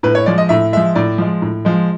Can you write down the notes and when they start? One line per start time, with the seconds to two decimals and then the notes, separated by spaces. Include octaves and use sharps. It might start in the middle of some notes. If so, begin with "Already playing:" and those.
0.03 A2 B4
0.15 C#5
0.26 F3 G#3 D5
0.38 D#5
0.49 A2 E5
0.73 F3 G#3 E5
0.95 A2 D5
1.18 F3 G#3
1.42 A2
1.65 F3 G#3